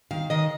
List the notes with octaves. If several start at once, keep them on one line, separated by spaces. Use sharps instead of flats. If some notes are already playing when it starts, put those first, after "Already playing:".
D#3 F5
D#3 D#5